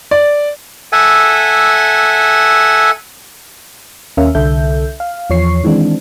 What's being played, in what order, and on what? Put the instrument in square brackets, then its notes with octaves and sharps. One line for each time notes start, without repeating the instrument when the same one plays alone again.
[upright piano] D5
[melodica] A4 E5 F#5 G#5
[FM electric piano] D#2 C#4 A#4 E5 F5
C2 D3 A4 E5 G6
F5
E2 F3 C#5 C#6 C7
D#3 E3 G#3 C4 D4